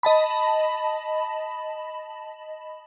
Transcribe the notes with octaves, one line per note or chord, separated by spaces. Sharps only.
D#5 A5 B5